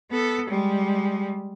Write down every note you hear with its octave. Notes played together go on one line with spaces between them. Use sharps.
B3 A4
G3 G#3